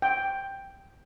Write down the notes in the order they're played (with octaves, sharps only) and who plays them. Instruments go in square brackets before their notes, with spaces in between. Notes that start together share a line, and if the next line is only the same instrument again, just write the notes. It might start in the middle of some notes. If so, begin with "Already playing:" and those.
[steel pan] G5